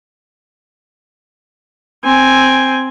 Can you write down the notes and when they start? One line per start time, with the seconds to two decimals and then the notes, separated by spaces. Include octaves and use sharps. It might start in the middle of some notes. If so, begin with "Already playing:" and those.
2.05 C4 G#5